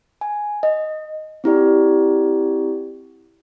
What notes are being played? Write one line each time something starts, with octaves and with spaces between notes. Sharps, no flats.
G#5
D#5
C4 E4 G4 D5